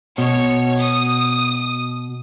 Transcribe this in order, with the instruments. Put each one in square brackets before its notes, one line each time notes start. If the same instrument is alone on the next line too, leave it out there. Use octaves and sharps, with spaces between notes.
[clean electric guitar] B2 [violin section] C#5
[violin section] D#6